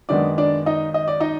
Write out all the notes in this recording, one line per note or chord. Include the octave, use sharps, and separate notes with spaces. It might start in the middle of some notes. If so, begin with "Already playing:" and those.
F#2 D#3 G#3 B3 D4 D5
D4 D5
D#4 D#5
D#5
D5
D#4 D#5